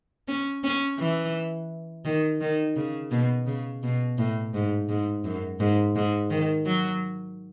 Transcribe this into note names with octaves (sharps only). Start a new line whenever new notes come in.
C#4
C#4
E3
D#3
D#3
C#3
B2
C#3
B2
A2
G#2
G#2
F#2
G#2
G#2
D#3
F#3